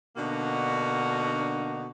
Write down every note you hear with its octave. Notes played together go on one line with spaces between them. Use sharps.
B2 D3 A#3 D4 D#4 F#4